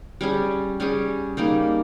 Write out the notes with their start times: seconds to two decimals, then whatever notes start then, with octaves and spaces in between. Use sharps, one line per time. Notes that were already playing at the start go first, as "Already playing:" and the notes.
0.21 G3 C#4 G#4
0.80 G3 C#4 G#4
1.37 G3 A#3 D#4 G#4